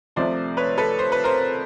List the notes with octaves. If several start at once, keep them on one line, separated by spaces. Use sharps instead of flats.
C2 C3 F3 A3 C5 D5
B4 C#5
A4 B4
C5
B4
A#4 C5